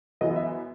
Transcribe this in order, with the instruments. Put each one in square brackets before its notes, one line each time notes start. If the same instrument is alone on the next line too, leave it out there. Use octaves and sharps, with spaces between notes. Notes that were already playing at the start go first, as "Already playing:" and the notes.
[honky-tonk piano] F#2 E3 B3 E4 [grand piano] D#5
[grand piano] E5